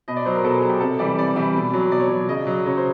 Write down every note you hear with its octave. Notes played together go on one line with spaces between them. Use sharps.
B2 D#5
D5
F#3 C5
A#4
B2 A4
G#4
F#3
G4
C3 A4
E3 G3 D5
C3 D5
E3 G3
B2
F#3
B2 D5
C#5
F#3 D5
C#3 D#5
F#3
C#3 C#5
C5